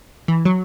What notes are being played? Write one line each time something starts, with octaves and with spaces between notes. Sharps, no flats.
E3
F#3